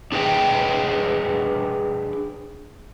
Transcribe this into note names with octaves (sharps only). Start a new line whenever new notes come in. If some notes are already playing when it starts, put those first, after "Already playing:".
D4 G#4 B4 D#5 G5